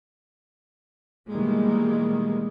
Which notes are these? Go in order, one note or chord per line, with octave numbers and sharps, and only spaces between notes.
B2 D#3 E3 G3 G#3 A#3